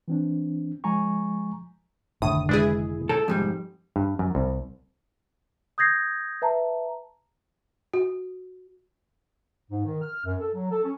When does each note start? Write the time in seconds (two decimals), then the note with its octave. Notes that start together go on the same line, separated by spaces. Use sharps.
0.08 E3 C4 D4
0.84 F3 G#3 G#5 A#5 C#6
2.22 F1 A2 D3 D#3 D#6
2.49 G#3 D4 E4 G#4 B4 D5
3.09 A4 C#5 G5 A#5
3.28 F2 G#2 G3
3.96 G2
4.19 F#2
4.35 C2
5.78 D#6 G6 G#6 A#6 C7
6.42 B4 E5 A5 A#5
7.94 F#4
9.71 G#2
9.85 D#3
10.02 F6
10.24 F#2
10.40 A4
10.54 F#3
10.71 A4
10.84 C#4